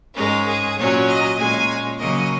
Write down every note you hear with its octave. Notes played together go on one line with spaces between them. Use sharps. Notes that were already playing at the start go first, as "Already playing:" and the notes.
G#2 G#3 C#4 A#4
G#4
A#2 F#3 C#4 C#5
D#5
A#2 G#3 C#4 G#5
C#3 F#3 A#3 C#4 D#5